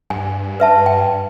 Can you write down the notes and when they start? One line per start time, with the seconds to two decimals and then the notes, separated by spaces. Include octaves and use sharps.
0.10 G2 G#5
0.60 B4 E5 A5
0.86 G5